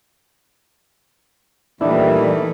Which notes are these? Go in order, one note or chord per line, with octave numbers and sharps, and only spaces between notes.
A#2 D#3 E3 G3 A3 D4 E4